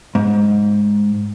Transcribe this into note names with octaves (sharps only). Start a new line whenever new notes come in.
G#2